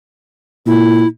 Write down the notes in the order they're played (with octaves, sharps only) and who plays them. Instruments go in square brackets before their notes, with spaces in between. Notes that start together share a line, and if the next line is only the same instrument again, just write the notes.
[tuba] A#2 [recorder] E4